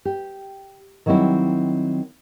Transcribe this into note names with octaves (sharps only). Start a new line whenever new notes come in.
G4
D#3 F#3 G3 C4 E4